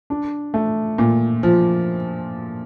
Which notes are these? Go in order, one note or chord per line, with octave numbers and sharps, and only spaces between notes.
D4
A3
A#2
F3